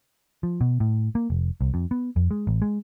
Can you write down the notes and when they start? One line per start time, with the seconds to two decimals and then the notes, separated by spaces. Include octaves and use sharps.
0.43 F3
0.61 B2
0.80 A2
1.15 A#3
1.30 F1
1.61 C2
1.74 F2
1.91 B3
2.16 F2
2.31 G#3
2.47 A1
2.62 G#3